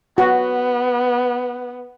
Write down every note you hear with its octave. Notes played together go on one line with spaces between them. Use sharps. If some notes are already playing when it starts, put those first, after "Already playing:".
B3 F#4